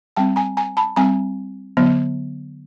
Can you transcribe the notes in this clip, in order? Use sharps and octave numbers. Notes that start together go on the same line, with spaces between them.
G3 C4 G5 A5
G#5 A#5
G#5 A#5
A5 B5
G3 C4 G#5 A#5
D3 F#3 B3